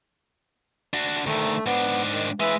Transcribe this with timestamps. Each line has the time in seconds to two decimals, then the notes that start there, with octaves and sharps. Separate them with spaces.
0.94 D4 F#4
1.26 D2 D#3 A3
1.66 G#2 B3 D4
2.11 D#3
2.40 E3 G#3 B4 E5